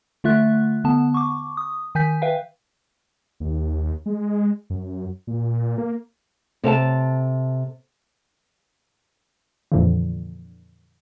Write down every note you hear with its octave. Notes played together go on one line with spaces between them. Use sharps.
D3 A3 F4 E5 F#6
D3 B3 A5
C#6 D6
D#6
D#3 G#5 G6 B6
B4 E5 F5 G5
D#2
G#3
F#2
A#2
A#3
C3 A4 F5 A5
F2 A#2 D3 E3 F3